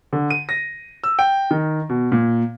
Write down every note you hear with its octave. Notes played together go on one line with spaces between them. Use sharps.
D3
D#7
A#6
E6
G5
D#3
B2
A#2